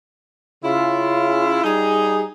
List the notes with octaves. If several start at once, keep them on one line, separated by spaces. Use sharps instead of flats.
C#3 E4 F4
G3 D#4 G#4